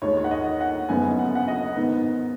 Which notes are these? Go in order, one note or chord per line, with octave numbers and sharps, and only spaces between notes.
D#2 D#3 G#3 C#5
F#5
D#5
F#5
F#1 F#2 C#3 B3 D#4 G#5
F#5
F#5
D#5
G#2 D#3 B3